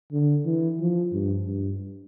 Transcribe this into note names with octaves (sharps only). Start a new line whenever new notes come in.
D3
E3
F3
G2
G2